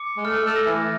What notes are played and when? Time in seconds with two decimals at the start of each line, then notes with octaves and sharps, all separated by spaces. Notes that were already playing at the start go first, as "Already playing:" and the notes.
Already playing: D6 C#7
0.17 G#3
0.25 A3 F6
0.46 A3
0.56 A#6
0.66 E3